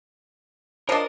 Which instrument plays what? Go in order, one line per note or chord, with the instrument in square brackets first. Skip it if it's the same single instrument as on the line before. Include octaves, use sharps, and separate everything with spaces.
[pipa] F3 D4 [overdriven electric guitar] A#4 [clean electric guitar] C#5 D#5